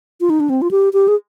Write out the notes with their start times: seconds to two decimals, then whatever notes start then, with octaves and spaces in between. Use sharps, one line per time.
0.21 F4
0.30 D#4
0.40 D4
0.50 C4
0.62 F4
0.71 G4
0.93 G4
1.08 G#4